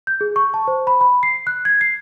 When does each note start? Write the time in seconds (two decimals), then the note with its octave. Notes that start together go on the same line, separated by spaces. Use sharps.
0.07 G6
0.21 G#4
0.36 C#6
0.54 A5
0.68 C5
0.87 B5
1.01 B5
1.23 C7
1.47 F#6
1.65 G#6
1.81 C7